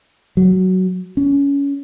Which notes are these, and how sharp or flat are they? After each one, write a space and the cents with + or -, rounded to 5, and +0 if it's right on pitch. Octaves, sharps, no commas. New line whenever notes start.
F#3 +10
C#4 +25